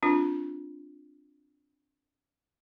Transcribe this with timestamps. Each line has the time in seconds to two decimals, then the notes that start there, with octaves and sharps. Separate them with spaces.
0.03 C4 D4 F4